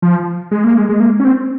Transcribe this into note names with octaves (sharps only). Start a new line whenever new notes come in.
F3
G#3
A#3
G#3
G#3
A#3
C#4
C4